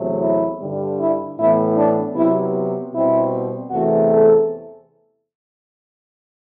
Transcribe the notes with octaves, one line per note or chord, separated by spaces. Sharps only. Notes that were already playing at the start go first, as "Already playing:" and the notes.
Already playing: E2 C3 F#3 A3
E4
G2 D3 G3
E4
A2 E3 B3 E4
D4
C3 F#3 B3 E4
B2 G3 C4 E4
E2 C3 E3 A3 C4 F#4
A4